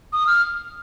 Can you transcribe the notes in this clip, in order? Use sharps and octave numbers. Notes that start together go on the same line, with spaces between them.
D#6
F6